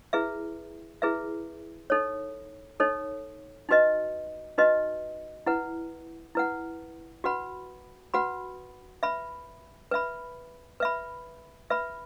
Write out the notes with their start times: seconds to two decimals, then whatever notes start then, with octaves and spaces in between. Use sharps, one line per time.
0.13 E4 G#4 B4 E5
1.02 E4 G#4 B4 E5
1.90 D#4 A4 C#5
2.80 D#4 A4 C#5
3.69 D#4 F#4 B4 D#5
4.58 D#4 F#4 B4 D#5
5.47 E4 B4 F#5
6.35 E4 B4 F#5
7.24 F#4 B4 F#5 B5
8.14 F#4 B4 F#5 B5
9.03 B4 E5 B5
9.91 B4 E5 B5
10.80 B4 E5 B5
11.70 B4 E5 B5